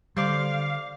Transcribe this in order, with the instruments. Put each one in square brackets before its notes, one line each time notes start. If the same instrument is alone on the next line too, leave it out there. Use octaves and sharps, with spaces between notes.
[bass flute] D3 [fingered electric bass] G3 [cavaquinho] C5 D5 D6 [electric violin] F5